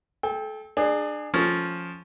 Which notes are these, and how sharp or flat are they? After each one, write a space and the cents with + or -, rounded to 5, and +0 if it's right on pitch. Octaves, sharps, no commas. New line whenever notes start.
A4 -30 G5 +20
D4 +30 G#4 +0
F3 +0 C#4 +0 A4 +0